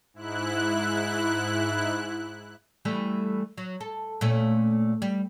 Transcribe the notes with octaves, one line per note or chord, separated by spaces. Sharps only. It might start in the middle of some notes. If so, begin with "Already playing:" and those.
G#2 E4 F#6
E3 G3 A3
F#3
A4
A#2 A3 C#4
G3